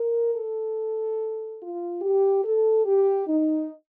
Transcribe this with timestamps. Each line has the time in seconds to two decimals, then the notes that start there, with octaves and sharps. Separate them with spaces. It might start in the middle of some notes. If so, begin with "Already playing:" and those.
Already playing: A#4
0.35 A4
1.60 F4
2.02 G4
2.43 A4
2.85 G4
3.27 D#4